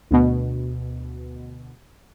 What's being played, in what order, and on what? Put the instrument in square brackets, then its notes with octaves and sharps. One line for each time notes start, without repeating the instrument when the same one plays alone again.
[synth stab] D2 B2